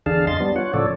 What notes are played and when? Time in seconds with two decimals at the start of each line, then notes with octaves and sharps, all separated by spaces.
0.06 E2 D3 D4 G#4 F5 A5
0.27 F2 D#5 C6 A6
0.40 G3 B3 D4
0.56 F4 C#5 F#5
0.74 A2 C#3 F3 A4 C#5 D5